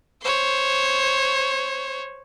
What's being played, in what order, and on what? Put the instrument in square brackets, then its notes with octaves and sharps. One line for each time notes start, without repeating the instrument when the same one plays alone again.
[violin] C5 C#5